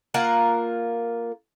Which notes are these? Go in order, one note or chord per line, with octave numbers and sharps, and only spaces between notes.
A#3 F4 A#4 F#5